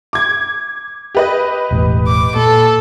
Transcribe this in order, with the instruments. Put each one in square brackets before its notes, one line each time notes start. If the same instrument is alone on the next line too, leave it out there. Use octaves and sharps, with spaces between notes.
[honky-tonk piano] D6 G#6
G4 B4 D#5
[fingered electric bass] E1 A1 A2
[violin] D6
[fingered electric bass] A#2 [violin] A4